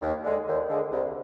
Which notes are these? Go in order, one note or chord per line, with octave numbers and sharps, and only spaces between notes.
D#2
D3 G#3
D#2
D3 G#3
C2